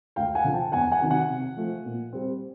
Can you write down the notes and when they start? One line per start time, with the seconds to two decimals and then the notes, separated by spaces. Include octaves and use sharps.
0.16 D2 F5 G5
0.35 F#5 G#5
0.44 D3 F3
0.54 G5 A5
0.72 E2 F#5 G#5
0.91 F#5 G#5
1.01 C3 D#3 F#3
1.10 F#5 G#5
1.29 C3
1.57 F3 A3
1.85 A#2
2.12 G3 C4